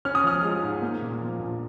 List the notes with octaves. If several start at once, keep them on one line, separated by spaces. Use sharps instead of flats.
C#4 F6
D#6
F3 F6
G#3
G#2
A#3
A#2
F3
A#1